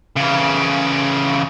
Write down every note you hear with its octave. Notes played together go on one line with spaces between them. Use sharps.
C#3 E3